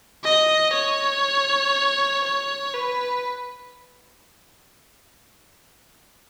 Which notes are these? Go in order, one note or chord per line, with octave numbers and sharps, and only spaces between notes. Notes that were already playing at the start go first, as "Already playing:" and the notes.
D#5
C#5
C#5
B4